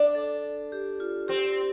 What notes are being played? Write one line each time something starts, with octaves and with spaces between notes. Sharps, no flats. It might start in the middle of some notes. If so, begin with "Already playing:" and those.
Already playing: D4
A4
G4
F4
C4 G4